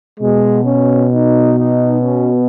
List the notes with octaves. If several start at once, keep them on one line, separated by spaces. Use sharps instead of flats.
B2 G#3
C#4
D#4
D#4
C#4